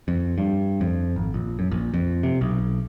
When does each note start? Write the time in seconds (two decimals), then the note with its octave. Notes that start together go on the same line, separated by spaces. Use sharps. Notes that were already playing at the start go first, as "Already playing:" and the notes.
0.08 F2
0.38 G2
0.81 F2
1.16 G#1
1.34 A#1
1.59 F#2
1.71 A#1
1.94 F2
2.23 C3
2.41 B1